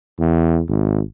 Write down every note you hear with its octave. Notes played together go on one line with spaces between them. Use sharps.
E2
G#1